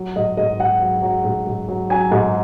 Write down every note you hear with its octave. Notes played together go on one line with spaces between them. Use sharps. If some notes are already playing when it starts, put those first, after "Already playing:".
Already playing: F#3
G#2 D#5
G#2 D#5
G#2 F#5
F#3
F#3
G#2
G#2
F#3
F#3 G#5
G#2